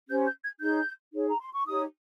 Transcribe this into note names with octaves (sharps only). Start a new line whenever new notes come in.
C#4 G4 C5 G6
G6
G#6
D#4 G#4 C#5 G6
D#4 G#4 C#5
A#5
C6
C#6
D#4 G4 C#5 D#6